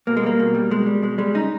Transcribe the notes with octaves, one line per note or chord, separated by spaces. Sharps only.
B2 A#3
G#3
G3 A#3
B2
G3
B2 G#3
G3
B2 G#3
G3 G#3
C#3 D#4